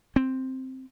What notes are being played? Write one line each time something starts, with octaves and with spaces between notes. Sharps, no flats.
C4